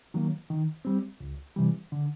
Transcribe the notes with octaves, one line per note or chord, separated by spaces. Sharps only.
D#3 F#3 A#3
D#3
G3 C4
C#2
C3 E3 G3
D3